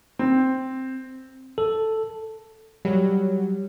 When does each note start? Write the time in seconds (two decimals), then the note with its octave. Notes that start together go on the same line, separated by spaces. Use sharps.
0.19 C4
1.58 A4
2.85 F#3 G3